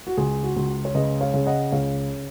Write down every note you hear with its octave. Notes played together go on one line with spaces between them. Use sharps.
F#4
C#2 G#4
F#4
C#2
C#5
C#3 B4 D#5
C#5 F5
C#3
D#5 F#5
C#2 C#5 F5